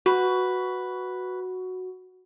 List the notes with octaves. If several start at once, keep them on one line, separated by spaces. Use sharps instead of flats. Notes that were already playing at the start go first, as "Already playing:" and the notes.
F#4 B4